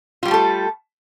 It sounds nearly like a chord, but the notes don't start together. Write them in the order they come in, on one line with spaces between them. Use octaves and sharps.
F4 G3 G4 A3 A4